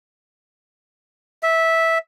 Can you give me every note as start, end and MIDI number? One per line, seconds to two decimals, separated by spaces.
1.43 1.98 76